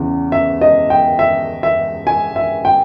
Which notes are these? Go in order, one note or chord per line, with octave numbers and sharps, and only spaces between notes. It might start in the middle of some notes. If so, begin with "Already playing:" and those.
Already playing: E2 C#3 E3
E5
D#5
G5
E5
E5
G#5
E5
G5